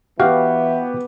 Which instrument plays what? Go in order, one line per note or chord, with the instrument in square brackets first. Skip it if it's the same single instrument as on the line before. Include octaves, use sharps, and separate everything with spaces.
[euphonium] E3 [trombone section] B3 [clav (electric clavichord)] F#4 F5 [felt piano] G4